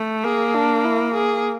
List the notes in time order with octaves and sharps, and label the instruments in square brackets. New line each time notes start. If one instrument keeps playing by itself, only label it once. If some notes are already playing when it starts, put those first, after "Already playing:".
Already playing: [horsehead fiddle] A3
[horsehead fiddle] A#3 [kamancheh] G#4
[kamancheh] D4
E4
G#4